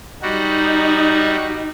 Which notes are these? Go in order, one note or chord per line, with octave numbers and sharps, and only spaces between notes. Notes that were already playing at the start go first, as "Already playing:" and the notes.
G3 D#4 F#4